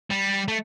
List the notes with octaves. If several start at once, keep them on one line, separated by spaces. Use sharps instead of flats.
G3
A3